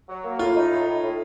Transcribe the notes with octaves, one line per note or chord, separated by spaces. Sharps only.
F#3
A#3
A2 F4
D#4
A2
A2
A2